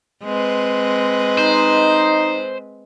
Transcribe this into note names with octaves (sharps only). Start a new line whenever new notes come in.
G#3 C4 B4
D#4 C5